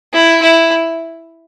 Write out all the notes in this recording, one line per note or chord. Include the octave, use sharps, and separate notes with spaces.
E4
E4